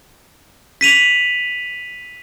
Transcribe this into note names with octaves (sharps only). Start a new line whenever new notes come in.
B6 D#7 F7 F#7